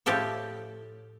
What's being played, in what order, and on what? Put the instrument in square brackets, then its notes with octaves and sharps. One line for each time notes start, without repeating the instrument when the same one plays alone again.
[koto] A2 F3 G4 A4 C#5